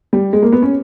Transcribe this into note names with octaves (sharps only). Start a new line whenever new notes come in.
G3
G#3
A#3
B3
C#4